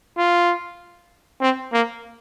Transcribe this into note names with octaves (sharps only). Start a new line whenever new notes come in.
F4
C4
A#3